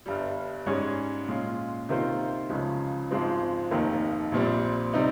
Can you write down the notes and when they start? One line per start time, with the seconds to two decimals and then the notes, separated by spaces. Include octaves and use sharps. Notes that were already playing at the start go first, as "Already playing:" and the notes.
0.06 G1 G2 G3
0.66 G#2 G3 C#4 G#4 C#5
1.28 A#2 G#3 C#4 F4
1.89 C3 D#3 A#3 F4 C5
2.49 C#2 C#3 F3 G#3 C#4
3.11 G#1 G#2 F3 G#3 C4
3.71 F1 D#2 D#3 A#3
4.32 A#1 A#2 G3 C4
4.93 C3 G3 C4 D#4